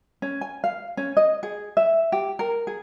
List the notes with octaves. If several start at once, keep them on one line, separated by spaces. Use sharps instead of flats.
C#4
G#5
F5
C#4
D#5
G#4
E5
G4
A#4
G#4